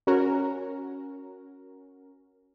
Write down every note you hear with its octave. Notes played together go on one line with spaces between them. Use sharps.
C#4 F#4 A#4